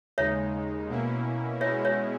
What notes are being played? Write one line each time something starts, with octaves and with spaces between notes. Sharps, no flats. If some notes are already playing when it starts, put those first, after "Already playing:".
D#2 C#3 G#3 D#4 C#5 E5
B2 A#3 C#4 E4
B2 G#3 C#4 E4 C#5 E5
C#5 E5